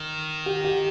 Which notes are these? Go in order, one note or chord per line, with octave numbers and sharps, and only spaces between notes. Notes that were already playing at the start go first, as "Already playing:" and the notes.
Already playing: D#3
G4
G4